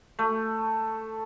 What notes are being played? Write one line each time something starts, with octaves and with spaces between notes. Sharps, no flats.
A3